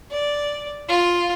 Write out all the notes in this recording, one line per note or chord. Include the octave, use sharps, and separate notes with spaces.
D5
F4